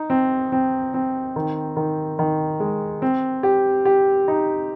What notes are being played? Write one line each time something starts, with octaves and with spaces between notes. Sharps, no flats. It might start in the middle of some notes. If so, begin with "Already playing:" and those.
Already playing: D#4
C4
C4
C4
D#3
D#3
D#3
G#3
C4
G4
G4
D#4